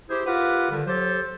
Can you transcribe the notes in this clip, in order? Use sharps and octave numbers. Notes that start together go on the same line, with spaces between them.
E4 G4 G#4 C5
F4 G4 A#4 B4 F#5
D3 D#3 G3
F#3 G4 A4 C5